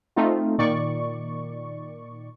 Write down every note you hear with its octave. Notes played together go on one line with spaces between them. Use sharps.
A3 C4 D#4 F4
A#2 D#3 D5 C#6